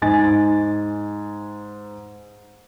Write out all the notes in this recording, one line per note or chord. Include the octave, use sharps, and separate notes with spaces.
G#2 D#4 G#5 A6